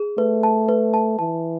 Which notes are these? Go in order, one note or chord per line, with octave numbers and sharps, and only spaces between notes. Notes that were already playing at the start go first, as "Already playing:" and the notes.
Already playing: G#4
A3 B4
A5
B4
A5
E3 A5